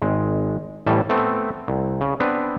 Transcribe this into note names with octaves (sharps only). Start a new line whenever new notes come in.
G#1 G#3
A1 A2 E3 G3 A5
A3 B3 C4
C2
C#3
B3 C4 D4 B4